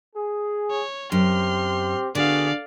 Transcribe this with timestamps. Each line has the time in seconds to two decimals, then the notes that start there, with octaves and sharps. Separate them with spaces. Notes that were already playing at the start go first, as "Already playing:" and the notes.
0.16 G#4
0.71 C#5
1.12 F#2 C4 G4 C6 F6
2.15 D3 B3 F#4 G#4 D5 F5